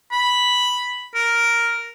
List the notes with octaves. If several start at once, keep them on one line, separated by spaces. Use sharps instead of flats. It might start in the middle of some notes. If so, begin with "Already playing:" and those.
B5
A#4